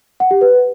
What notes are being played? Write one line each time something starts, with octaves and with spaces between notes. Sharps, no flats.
F#5
G4
B4